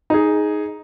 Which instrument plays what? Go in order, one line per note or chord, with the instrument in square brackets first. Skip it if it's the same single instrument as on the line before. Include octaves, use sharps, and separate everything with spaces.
[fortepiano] D#4 G#4